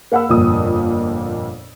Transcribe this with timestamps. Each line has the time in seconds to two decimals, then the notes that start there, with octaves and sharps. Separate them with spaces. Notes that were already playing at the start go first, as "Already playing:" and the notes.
0.12 A#3 F5 F#5 B5 E6
0.29 G1 F2 A#2 D#6